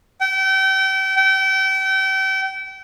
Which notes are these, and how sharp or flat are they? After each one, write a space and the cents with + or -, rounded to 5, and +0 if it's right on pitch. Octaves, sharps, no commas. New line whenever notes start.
G5 -35
G5 -35